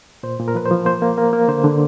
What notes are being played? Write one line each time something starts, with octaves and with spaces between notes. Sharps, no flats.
A#2 C5
A#2
A#4
F3 B4
C5
F3
A#3 C5
A#3
A#3 A#4
A#3
D3 C5
D3